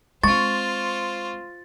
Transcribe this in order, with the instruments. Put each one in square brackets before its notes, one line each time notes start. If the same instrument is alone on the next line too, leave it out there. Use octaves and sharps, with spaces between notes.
[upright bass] G#3 C4 [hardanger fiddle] F4 C5 [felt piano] C#6 [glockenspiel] A6